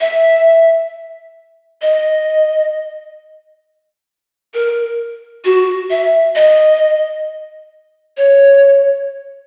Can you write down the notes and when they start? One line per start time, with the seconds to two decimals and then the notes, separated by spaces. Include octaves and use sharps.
0.01 E5
1.82 D#5
4.54 A#4
5.45 F#4
5.90 E5
6.36 D#5
8.17 C#5